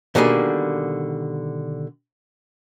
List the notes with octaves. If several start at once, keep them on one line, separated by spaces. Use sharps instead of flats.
B2 D3 D#3 G3 A#3 G#4